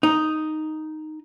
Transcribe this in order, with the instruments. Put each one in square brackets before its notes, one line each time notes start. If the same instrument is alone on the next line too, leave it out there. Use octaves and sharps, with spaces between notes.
[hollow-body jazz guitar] D#4